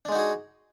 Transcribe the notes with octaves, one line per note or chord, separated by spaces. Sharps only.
G#3 D4 D#4 F#4 G#4